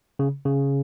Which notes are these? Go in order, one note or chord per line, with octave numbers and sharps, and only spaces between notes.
C#3
C#3